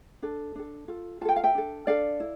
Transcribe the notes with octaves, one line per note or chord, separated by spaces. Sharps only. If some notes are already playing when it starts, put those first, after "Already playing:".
D4 A4
D4 A4
F4 A4
F4 A4 G5 A5
F5
E5 G5
D4 A4
D4 A4 D5 F5
E4